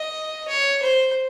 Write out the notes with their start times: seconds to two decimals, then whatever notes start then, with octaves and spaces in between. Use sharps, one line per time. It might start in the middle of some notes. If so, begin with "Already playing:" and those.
Already playing: D#5
0.48 C#5
0.82 C5